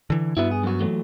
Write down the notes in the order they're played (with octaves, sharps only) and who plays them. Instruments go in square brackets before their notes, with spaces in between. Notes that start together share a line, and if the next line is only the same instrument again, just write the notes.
[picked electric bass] D3 E3
[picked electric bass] G2 B3 [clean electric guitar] E4 F#4 E5
[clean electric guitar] G#4
F#2 F#4
E3 F#3 A3